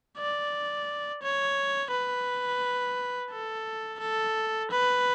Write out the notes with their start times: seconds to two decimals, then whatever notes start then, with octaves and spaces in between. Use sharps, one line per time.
0.18 D5
1.22 C#5
1.91 B4
3.31 A4
4.00 A4
4.71 B4